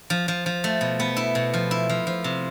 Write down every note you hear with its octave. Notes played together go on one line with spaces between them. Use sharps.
F3
F3
F3
A3
B2
B3
E4
B2
F3
E4
F3
F3
C3